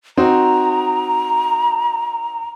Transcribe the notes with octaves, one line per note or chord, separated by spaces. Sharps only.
C4 D#4 F#4 A#5